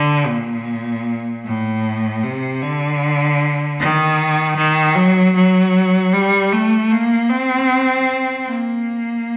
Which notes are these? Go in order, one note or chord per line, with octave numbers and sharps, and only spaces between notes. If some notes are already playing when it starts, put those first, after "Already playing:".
Already playing: D3
A#2
A2
C3
D3
D#3
D#3
F#3
F#3
G3
A3
A#3
C4
A#3